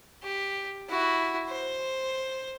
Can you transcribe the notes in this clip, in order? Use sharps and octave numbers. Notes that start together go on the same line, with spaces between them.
G4
E4 F#4
C5